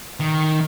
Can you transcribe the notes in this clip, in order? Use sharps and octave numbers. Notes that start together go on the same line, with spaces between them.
D#3